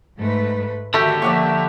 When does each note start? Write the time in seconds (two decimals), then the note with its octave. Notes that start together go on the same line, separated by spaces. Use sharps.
0.19 G#2 A3 B4
0.94 D3 D#3 A3 F#4 G4 E5
1.22 F3 A#3 D5 E5 F#5 C#6